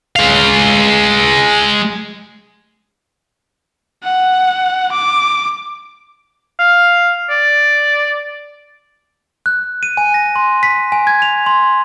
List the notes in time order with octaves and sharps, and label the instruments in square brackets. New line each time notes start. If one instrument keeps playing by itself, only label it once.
[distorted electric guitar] G#3 F5
[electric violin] F#5
D6
[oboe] F5
D5
[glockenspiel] F#6
D#7
G#5
A#6
C6
B6
G#5
G#6
F7
C6